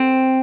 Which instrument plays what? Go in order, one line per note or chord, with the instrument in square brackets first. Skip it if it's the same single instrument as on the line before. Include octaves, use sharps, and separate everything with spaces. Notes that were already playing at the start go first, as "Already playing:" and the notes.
Already playing: [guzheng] C4